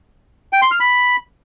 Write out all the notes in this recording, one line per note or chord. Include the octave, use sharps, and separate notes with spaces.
G5
C6
F6
B5